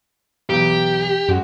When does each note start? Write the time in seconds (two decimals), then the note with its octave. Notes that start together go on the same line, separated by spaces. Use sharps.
0.50 B1 E2 G4
1.28 F#2 G#3 F#4